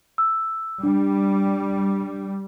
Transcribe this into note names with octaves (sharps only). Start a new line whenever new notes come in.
E6
G3 D4